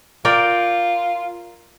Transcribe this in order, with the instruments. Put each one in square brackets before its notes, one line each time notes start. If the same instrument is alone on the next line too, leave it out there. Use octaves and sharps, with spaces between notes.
[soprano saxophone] F4 [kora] A#4 D5 G5